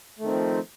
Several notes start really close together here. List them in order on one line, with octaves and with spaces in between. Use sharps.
A3 D#3 C4 F3